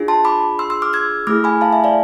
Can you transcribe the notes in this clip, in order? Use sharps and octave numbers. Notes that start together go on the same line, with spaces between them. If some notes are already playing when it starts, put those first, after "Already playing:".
Already playing: D4 F4 G#4
A5 C6
B5 D6
C6 E6
C6 E6
D6 F6
E6 G#6
A3 E4 G#4 D6 F6
G#5 B5
F5 A5
E5 G#5
D5 F5